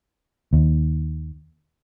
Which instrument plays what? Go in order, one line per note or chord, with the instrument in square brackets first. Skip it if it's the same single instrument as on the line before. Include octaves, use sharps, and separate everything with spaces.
[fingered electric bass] D#2